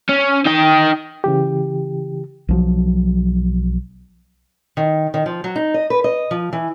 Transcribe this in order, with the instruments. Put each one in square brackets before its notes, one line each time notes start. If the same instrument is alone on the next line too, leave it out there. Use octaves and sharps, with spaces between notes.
[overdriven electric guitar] C#4
D#4 G5
[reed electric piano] C#3 E3 G4
[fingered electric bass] B1 F3 F#3
[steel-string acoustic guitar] D#3
D#3
F3
F#3
D#4
D#5
B4
D#5
F3
E3